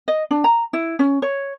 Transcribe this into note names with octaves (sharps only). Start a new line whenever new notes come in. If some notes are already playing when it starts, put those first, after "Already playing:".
D#5
D4
A#5
E4
C#4
C#5